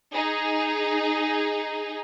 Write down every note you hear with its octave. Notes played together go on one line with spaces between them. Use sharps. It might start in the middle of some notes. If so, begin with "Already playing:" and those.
D#4 G#4